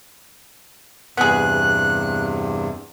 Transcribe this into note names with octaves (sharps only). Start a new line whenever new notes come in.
E2 G2 C3 B3 G#4 F#6